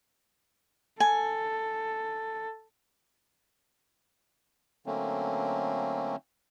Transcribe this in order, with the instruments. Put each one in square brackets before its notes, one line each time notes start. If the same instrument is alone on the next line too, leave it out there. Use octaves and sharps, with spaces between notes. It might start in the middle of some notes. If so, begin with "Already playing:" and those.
[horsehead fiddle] A4 [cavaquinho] G#5
[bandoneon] D3 F#3 A3 A#3 C4 C#4